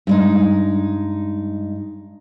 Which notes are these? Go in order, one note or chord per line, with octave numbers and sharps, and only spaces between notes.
G2 G#3 D#4